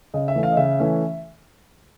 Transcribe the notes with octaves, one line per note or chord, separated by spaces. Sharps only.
C#3 D#5
E5
E3 A3 C#4
F5
D#5
C#3 E5
E3 A3 C#4